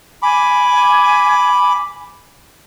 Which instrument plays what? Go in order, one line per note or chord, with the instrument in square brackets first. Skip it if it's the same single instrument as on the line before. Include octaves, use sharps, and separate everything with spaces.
[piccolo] G#5 [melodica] B5 D6